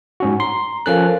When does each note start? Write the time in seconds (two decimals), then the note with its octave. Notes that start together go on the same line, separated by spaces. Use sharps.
0.20 G#2 C#4 F#4
0.40 A#5 C6
0.86 F3 C#4 A4 A#4 F5 F#6